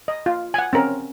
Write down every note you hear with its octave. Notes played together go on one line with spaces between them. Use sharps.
D#5
F4
F#5 G#5
C4 C#4 A#4